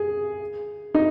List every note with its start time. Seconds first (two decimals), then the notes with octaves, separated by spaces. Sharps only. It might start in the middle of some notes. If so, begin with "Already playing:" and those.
Already playing: G#4
0.94 D#4